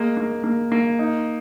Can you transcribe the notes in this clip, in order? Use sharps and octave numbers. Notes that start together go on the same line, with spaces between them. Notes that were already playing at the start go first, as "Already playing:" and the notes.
Already playing: G#3 A#3
A#3
A#3
A#3
D#4